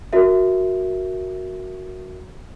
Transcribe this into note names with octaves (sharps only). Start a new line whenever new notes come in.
F#4 A#4 E5